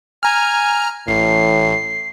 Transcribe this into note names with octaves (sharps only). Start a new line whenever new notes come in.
G#5 A#5 F6
A1 A2 C7